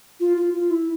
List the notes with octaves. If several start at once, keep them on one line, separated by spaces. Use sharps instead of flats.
F4
F4
F4
E4